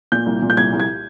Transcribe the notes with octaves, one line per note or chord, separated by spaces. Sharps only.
A#2 G6
C2
A#2
G6
C2 G#6
C2
G#6